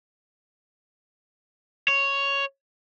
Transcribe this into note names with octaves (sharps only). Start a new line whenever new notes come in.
C#5